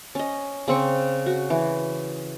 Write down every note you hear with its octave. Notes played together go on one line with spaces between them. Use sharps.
C#4 D#5
C#3 C4 C#6
F#4
E3